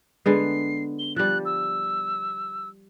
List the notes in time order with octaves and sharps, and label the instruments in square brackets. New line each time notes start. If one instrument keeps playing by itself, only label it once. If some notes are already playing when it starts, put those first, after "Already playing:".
[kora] D3 G#3 B3 [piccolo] C7
[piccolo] G7
[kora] F3 G3 [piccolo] F#6
[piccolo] E6